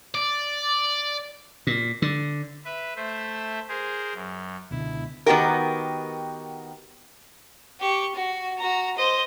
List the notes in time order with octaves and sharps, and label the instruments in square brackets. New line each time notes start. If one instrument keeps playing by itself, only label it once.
[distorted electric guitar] D5
[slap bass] A#2
D3
[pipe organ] B4 E5
A3 C5 E5
G#4 A#4 C5
F#2
[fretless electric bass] C#2 B2 D3 [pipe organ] E4
[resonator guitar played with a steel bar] D#3 B3 F#4 G4 A#4
[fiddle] G4 C#6
F#4
F#4 A#5
C5 D#5